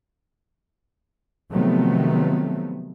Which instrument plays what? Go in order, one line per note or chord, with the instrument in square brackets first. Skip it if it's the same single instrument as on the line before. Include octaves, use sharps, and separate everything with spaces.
[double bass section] C3 D#3 F3 F#3 A3 B3